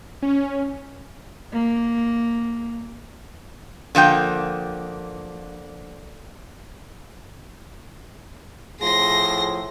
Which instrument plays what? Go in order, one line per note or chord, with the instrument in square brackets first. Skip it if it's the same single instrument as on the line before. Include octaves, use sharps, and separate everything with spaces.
[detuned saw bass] C#4
[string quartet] A#3
[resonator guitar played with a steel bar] D3 F3 A#3 G5
[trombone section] A2 F3 G#4 [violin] C6 A#6